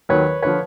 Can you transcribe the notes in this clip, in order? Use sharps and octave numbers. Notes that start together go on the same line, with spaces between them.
D#2 D#3 F#3 B4 C#5
D3 F3 B4 C#5